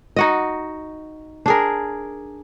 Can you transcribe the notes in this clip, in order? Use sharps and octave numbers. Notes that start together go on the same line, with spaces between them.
D#4 F#4 D#5
D4 G#4 A#4